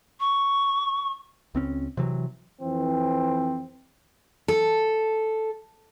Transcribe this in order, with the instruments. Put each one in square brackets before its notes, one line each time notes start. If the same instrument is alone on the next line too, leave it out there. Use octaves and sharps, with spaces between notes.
[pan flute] C#6
[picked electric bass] C#2 C4 C#4
C3 E3 F#3
[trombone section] F2 E3 C4
[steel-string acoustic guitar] A4